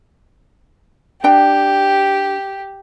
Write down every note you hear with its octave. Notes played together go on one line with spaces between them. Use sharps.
D4 G4 G5